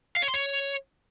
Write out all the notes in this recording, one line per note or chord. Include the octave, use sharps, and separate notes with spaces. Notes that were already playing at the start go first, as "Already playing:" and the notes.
F5
C#5
C6
C#5